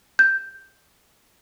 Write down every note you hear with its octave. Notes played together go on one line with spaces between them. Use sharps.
G6